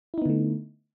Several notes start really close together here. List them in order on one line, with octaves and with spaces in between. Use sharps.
E4 D#4 B3 D3 A3